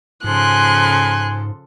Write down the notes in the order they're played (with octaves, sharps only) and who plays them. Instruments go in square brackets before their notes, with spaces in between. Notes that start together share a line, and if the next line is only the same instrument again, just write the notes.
[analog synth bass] G#2 [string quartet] C#3 F3 A4 [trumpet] G#5 [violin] C6 F#6